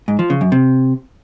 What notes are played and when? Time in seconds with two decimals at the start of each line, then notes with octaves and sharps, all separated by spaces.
0.08 G#2
0.19 F3
0.30 C#3
0.41 F#2
0.52 C3